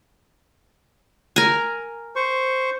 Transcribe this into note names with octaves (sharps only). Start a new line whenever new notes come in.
A#4 G#5
C5 C#6